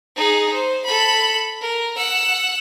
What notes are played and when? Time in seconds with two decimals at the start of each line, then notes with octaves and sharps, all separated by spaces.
0.16 D#4 G#4
0.53 C5
0.85 A4 B5
1.61 A#4
1.97 F#5 E6